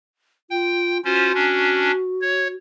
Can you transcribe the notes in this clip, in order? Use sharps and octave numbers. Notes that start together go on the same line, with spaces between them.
F4 G5
C#4 F4 F#4 C5
C#4 D4
C#5